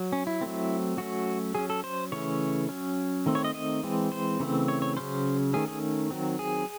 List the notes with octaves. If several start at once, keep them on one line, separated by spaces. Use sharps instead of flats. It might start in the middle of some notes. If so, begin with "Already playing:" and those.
Already playing: F#3
C#4
E4
F#3 A3 C4
F#3 A3 C#4 F#4
F#3 C#4 G#4
A4
C5
C#3 E3 A3 C#4 C#5
F#3 C#4
D#3 A3 C4
C#5
D#5
D#5
E3 G#3 C4
C5
C#3 E3 A3 C4
C#5
C#5
C#3 F#3 C#4 C5
D#3 A3 C#4 G#4
G#4
D#3 F#3 C4
G#4